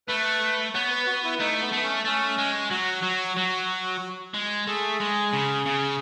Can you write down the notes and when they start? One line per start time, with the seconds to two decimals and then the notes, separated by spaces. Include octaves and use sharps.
0.08 A3 B4
0.74 B3 C#5
0.90 B4
1.07 F#4
1.24 E4
1.40 A3 D#4
1.61 B3
1.73 A3
1.83 C#4
2.05 A3 C#4
2.38 G#3
2.71 F#3 F#4
3.03 F#3
3.37 F#3
4.34 G#3
4.67 A3 G#4
5.00 G#3
5.33 C#3
5.66 C#3